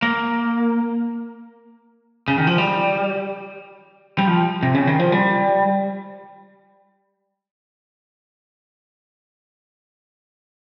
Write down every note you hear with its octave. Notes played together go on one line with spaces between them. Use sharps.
A#3
C#3
D#3
F3
G3
G3
F3
C3
C#3
D#3
F3
G3